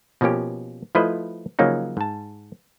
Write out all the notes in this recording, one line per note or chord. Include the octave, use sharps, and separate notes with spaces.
B2 F3 A#3 C#4 G4
F3 A3 E4 B4 C5 D#5
C#3 F3 F#3 A#3 C#4 D#4
G#2 A5